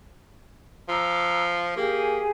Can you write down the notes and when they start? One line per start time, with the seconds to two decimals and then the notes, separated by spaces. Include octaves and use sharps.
0.88 F3 A#5 D6 E6
1.76 A#3 G4 G#4